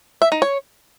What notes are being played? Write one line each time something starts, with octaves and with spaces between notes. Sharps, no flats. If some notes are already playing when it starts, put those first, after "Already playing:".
E5
D#4
C#5